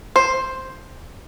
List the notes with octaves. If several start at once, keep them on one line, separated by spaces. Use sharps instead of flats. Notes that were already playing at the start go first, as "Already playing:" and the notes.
C5